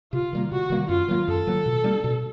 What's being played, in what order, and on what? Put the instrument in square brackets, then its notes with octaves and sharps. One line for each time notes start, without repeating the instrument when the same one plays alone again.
[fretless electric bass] C3 [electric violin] F4
[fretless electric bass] D#3 G3 A#3
[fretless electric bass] C3 [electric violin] F#4
[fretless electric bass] D#3 G3 A#3
[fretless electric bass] F#2 [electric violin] F4
[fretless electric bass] D#3 F#3 A#3
[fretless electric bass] F#2 [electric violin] A4
[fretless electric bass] D#3 F#3 A#3
B2
G3 A#3 D4
B2